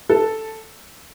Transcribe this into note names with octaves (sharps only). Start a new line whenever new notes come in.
A4